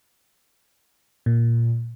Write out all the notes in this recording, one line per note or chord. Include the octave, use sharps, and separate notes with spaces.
A#2